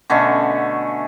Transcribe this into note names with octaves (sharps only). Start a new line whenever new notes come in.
B2 D3 A3 C#4